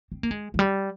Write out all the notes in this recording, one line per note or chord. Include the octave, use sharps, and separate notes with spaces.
C4
A#3
G#3
F3
G3